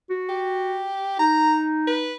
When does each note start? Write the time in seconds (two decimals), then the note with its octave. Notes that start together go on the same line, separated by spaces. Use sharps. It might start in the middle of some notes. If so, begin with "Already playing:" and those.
0.10 F#4
0.29 G4
1.19 D#4 A#5
1.88 B4